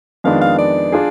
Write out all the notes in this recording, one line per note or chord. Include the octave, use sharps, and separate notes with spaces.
F2 D#3 G#3 B3 D4 F5
F5
D5
D4 F4 G#4